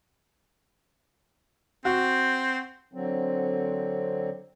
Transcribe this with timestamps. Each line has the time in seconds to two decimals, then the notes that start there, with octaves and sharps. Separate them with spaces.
1.85 C4 F#4
2.94 D3 F#3 C4